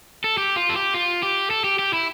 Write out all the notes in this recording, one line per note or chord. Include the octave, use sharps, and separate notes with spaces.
A4
G4
F4
A4
G4
F4
G4
A4
G4
G4
E4